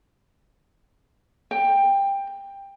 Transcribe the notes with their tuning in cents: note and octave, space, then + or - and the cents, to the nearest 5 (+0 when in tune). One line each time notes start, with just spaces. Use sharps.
G5 +15